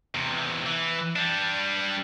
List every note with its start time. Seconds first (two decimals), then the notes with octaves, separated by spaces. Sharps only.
0.15 E2 C3
0.66 E3
1.16 G3 D4